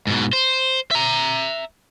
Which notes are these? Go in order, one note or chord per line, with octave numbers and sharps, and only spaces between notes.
G#2 B2
C5
E5 A#5